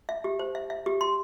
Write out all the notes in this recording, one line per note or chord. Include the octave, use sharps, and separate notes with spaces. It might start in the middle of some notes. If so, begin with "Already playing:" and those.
E5
G4
C5
E5
E5
G4
C6